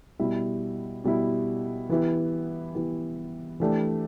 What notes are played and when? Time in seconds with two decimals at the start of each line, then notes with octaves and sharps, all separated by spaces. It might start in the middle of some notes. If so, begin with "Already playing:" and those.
0.19 B2 G3 E4
1.04 B2 G3 E4
1.89 E3 B3 E4 G4
2.75 E3 B3 E4 G4
3.60 E3 A3 D4 G4